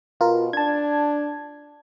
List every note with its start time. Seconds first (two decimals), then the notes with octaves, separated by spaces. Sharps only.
0.21 B2 F4 A#4
0.53 D4 A5 G#6